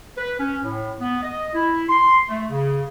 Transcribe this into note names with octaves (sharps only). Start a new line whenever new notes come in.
B4
C#4
A2
B3
D#5
E4
C6
A3
C#3